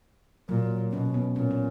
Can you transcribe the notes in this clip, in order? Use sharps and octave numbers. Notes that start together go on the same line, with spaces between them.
A#2 F#3
B2 C#4
B3
A#2 C#4
C#4